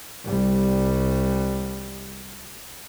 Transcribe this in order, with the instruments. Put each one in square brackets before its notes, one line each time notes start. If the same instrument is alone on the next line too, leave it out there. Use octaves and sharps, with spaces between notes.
[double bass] C2 G3